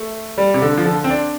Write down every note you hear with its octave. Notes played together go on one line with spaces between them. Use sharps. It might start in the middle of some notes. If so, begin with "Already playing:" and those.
Already playing: A3
G3
C3
D3
F3
D3
C4
D4